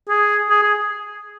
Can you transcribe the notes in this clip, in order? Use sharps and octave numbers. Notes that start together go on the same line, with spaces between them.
G#4
G#4
G#4